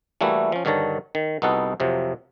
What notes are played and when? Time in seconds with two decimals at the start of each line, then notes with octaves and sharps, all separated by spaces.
0.21 E3 G3 A3 A#3 E4 F#4
0.52 F3 C#4
0.65 G2 D3 D#3 C#5 A5 A#5
1.15 D#3
1.42 C2 B3 D#4 F#4 A4 F#5
1.80 F2 C3 F3 F#3